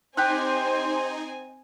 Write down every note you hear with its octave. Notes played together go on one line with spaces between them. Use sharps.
C4 D#4 G4 C5 G#5 F#6